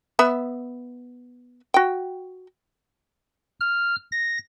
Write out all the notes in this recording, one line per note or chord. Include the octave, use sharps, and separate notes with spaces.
B3 E5 B5
F#4 G5
F6
A#6